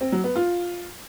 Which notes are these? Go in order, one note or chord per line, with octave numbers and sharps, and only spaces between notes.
C4
F#3
B3
F4